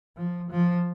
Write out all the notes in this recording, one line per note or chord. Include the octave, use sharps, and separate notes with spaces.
F3
F3